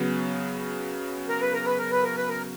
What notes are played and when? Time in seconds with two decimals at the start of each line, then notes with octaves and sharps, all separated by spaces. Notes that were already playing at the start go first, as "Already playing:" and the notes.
Already playing: C#3 F#3 B3
1.28 A#4
1.41 B4
1.53 A#4
1.66 B4
1.79 A#4
1.92 B4
2.03 A#4
2.17 B4
2.29 A#4